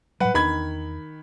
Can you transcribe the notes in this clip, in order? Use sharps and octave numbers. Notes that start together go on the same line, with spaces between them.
A2 F#3 G3 B4 F#5
E2 D#3 D4 B5 G#6